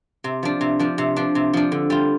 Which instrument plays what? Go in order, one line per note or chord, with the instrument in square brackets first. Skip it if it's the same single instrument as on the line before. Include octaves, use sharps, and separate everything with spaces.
[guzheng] C3
F3 D4
C3
F3 D4
C3
F3 D4
C3
F3 D4
D3
G3 F4